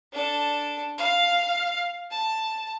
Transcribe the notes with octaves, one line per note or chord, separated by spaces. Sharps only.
D4 A4
F5
A5